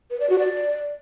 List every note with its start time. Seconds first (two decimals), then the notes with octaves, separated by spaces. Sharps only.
0.10 B4
0.20 D5
0.30 F#4
0.39 D5